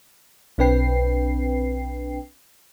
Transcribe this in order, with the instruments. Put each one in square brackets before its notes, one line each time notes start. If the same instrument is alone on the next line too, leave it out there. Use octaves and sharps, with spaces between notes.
[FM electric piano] B1 C4 D4 B4 G5 C7